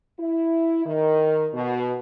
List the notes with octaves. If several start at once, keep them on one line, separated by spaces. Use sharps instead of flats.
E4
D#3
B2